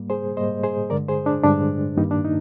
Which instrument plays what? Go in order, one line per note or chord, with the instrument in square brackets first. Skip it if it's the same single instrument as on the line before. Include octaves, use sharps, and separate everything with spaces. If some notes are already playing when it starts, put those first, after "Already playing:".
Already playing: [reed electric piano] G#2 G3 A#3
G#4 C5
G#2 G3 A#3 C5 D#5
G#4 C5
G2 D3 G#3 A#4 D5
G#4 C5
D4
G2 D3 G#3 D4
G2 D#3 G3 A#3 D#4
D4
D#4